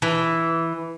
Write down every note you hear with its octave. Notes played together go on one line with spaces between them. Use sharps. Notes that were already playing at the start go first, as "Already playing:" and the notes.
E3